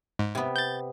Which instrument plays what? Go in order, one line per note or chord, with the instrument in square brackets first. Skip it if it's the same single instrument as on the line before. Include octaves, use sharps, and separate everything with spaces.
[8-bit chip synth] G#2
[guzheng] C3 B3
[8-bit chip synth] G6 A6